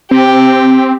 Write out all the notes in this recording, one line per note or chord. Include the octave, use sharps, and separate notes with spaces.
C4 G4